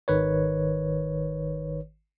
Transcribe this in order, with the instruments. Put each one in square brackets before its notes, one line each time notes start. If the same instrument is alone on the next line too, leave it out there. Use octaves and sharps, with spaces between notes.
[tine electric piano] G#1 D#3 B4 C#5